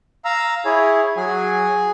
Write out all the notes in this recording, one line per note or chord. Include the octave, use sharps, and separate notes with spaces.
F5 A#5 E6
E4 G#4 C#5
F#3 G#4 G#5